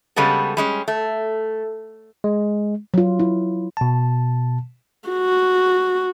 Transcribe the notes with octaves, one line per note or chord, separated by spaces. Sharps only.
C#3 G3 G#3 B3 A4
G3 G#3 C#4
A3
G#3
F#3 F4
E4
B2 A5
F#4